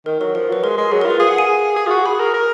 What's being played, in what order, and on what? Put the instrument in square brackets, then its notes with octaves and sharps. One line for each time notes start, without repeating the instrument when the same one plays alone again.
[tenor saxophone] D#3 [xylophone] A#4
[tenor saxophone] F#3 [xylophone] A#4
[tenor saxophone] F3 [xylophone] A#4
[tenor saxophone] F#3 [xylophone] B4
[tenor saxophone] G#3 [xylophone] A#4
[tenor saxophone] G#3
[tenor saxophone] F#3 [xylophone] G#4
[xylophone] A#4
[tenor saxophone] F4 [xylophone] B4
[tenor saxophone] G#4 [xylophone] F5
[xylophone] F#5
G#5
[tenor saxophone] G#4
F4
F#4
[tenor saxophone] G#4 [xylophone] B5
[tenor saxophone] A#4
A#4